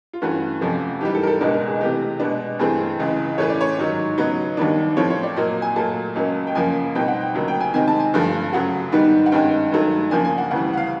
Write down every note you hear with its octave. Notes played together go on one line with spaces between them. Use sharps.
F4
G2 E3 A3 C#4 F#4
F2 C3 F3 A3 C#4
G#2 E3 G3 G4
A4
A#4
A4
C#2 B2 G#3 B3 D4 A#4
A#4
G#4
C3 E3 A3 G4
B2 G#3 B3 D4
G2 E3 A3 C4 G#4
C#2 C#3 E3
A2 E3 A3 C#4 C#5
D5
C#5
G#2 D#3 F#3
C#3 F#3 B3 D#4
D#2 D#3 G3 B3 D4
A2 F3 A3 C4 C#5
C#5
D5
A#2 F#3 A#3 D#5
G#5
A#2 F#3 A3 A5
C#2 C#3 F#3 A#3 C#4
G5
F#2 C#3 F3 A#3 C#4 G#5
B2 G3 C4 D#4 G5
F#5
G5
D2 C#3 F#3 A#3
G5
G#5
C3 D#3 G#3 C4 G#5
A5
G#5
G2 D3 F3 A3
F#2 C#3 F#3 A3 F#5
G#2 D#3 G3 B3 D#4
F#5
G2 D#3 G#3 C#4 G5
G2 D#3 F#3 A3
C#3 F3 A#3 D4 G#5
G#5
F#5
D2 C#3 E3 G3 F#5
F#5
F5